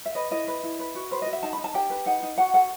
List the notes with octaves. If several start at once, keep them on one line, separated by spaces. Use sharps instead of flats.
E5
B4 D#5
E4 D#5
B4
E4
B4
F#4
B4 C5
F#4 D#5
E5
D#4 A5
B5
D#4
A5
G4 G5
B4
D#4 F#5
D#4
F#4 F#5
A4 F#5